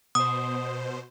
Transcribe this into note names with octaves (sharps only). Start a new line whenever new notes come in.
B2 C5 D#6